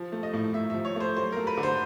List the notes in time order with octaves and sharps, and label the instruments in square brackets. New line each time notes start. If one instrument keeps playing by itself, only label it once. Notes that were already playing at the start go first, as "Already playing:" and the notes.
Already playing: [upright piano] F3
A3
D#5
A2
A2 E5
E5
F3
C#5
A3 C5
F#3 C5
A#4
A3
B4
D3
C5